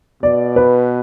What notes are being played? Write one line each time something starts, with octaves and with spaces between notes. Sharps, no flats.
B2 D5
B4